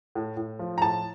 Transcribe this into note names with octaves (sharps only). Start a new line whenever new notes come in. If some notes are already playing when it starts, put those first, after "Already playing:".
A2
A2
F3
A#5
A2 A5